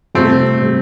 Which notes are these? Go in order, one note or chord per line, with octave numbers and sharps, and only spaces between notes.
F2 C3 G3 A3 C4
C3 G3